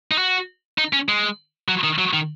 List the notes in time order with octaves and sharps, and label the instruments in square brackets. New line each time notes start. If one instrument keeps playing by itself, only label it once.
[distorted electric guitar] D#4
F#4
D#4
C#4
G#3
F#3
D#3
F#3
D#3